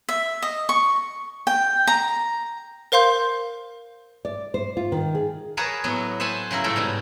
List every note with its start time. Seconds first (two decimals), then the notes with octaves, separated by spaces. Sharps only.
0.09 E5
0.42 D#5
0.69 C#6
1.47 G5
1.87 A#5
2.92 A#4 C5 F5 C6 G6
4.25 D5
4.54 C5
4.77 F4
4.92 D#3
5.15 G#4
5.57 G#4 A#4 B4 C#5 A5 A#5
5.84 A2 F#3 B3
6.20 C5 E5 F#5 G#5 A5
6.51 C#3 F#3 E4 A#4
6.64 A2 A3 F4 A4 A#4 G5
6.76 G#2 B2 G3